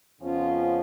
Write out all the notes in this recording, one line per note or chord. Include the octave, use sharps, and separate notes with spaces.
F2 C#3 F3 B3 C#4 F4